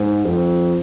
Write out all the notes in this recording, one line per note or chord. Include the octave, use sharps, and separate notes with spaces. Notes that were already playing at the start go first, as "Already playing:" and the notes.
Already playing: G#2
F2